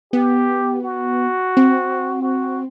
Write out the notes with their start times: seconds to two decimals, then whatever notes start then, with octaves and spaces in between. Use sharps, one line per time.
0.13 B3 G4
0.82 F#4
1.57 C4
2.22 F#4